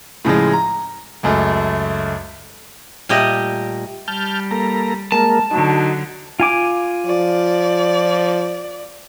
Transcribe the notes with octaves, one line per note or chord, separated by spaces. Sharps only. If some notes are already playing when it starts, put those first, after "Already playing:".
A2 C#3 F3 G#3
A#5
C#2 F#2 A3
A#2 G3 A3 G4 D#5
G3 A5 F6 G6
A#3 A4 A#5
G#3 A#3 A#4 A5
D3 F#3 D#4
F4 G#5 D6
F3 D5